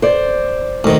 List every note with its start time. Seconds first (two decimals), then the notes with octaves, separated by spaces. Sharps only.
0.02 C5 D5
0.84 D2 D#3